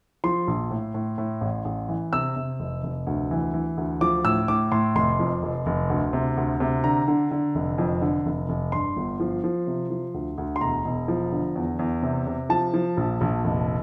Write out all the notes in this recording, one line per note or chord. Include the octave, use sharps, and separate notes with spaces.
F3 C6
A#1
A2
A2
A2
A1
A1
E3
C3 E6
C3
F1
F1
D2
E3
E3
D2
F3 D6
A2 E6
A2 D6
A2 C6
F1 C6
F2
F1
F1
D2
C3
D2
C3
D3 A#5
D3
D3
F1
F2
D3
F1
F1
G2 C6
G1
F3
F3
C3
F3
D2
D2
C6
E1 A#5
E1
F3
D3
E2
E2
C3
C3
F3 A5
F3
A#1
A#1
F1